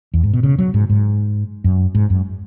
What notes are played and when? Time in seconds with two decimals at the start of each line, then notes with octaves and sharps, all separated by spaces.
0.14 E2
0.23 G#2
0.33 B2
0.43 C#3
0.59 F#3
0.74 G#2
0.90 G#2
1.64 F#2
1.95 G#2
2.10 F#2